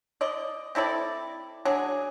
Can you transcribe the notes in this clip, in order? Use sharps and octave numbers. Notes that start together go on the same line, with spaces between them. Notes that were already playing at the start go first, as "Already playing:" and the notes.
D5 D#5
C4 E4 A4 D5
F#3 D4 G#4